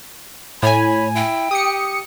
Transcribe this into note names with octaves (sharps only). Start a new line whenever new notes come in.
A2 C#5 G#5 B5
E4 G5
G4 D#6 C#7